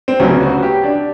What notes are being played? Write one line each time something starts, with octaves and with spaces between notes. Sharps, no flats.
C4
D2 C#3 F#3 B3 C#4
F#4
G4
D4